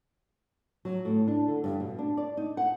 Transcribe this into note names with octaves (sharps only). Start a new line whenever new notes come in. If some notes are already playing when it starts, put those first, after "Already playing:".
F#3
A2
D4
D3
G2
B2
D4
D5
D#4
F#5